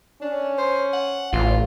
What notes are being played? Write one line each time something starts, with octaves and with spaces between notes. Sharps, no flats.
C#4 D4
C5
F#5
A1 F4